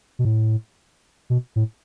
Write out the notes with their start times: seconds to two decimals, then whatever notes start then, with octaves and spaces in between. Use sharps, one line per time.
0.19 B2
0.25 A2
1.30 B2
1.56 A2